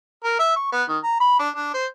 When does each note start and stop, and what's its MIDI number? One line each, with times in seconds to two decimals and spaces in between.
0.24 0.38 70
0.39 0.51 76
0.56 0.69 85
0.73 0.83 59
0.89 0.98 51
1.03 1.19 82
1.20 1.37 83
1.40 1.49 62
1.56 1.69 62
1.74 1.85 72